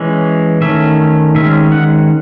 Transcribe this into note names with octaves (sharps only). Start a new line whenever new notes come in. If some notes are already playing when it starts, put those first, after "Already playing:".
Already playing: E3 G#3 C#4
D#3 A3 C#4 E5
D#3 G#3 C#4 E5
F#5